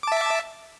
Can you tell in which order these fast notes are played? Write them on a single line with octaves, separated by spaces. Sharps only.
D6 A5 E5